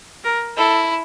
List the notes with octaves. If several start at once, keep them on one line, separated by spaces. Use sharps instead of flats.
A#4
E4 A4